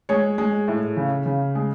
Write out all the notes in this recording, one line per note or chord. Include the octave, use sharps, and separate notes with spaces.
G#3 C#5
G#3
A2
C#3
C#3
G#3